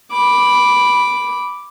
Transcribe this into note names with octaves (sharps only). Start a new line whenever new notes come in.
B5 D6